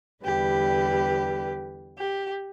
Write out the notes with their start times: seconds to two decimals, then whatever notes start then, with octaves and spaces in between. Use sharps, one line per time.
0.24 E2 D3 G3 G4 B4
1.99 G4